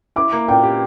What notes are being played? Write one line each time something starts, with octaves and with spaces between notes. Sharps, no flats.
E4 D6
A#3
A#2 G5
G4